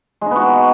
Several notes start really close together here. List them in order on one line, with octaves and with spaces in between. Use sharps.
G#3 D#4 B3 F#4